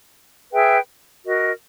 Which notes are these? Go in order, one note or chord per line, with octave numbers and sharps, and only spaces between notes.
G#4 B4 E5 G5
F#4 A#4 D#5